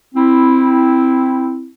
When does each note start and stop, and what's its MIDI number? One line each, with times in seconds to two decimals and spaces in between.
0.15 1.70 60
0.15 1.70 64